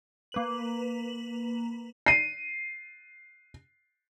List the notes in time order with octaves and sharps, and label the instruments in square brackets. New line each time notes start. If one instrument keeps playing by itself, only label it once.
[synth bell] A#3 B4 F#7
[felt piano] C7 D#7